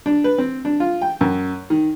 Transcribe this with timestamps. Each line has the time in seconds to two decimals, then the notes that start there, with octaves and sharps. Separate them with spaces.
0.06 D4
0.24 B4
0.38 C4
0.65 D4
0.80 F4
1.02 G5
1.21 F#2
1.70 D#3